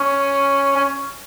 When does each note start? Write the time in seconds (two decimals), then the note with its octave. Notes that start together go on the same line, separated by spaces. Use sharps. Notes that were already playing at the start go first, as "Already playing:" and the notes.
Already playing: C#4
0.75 C#4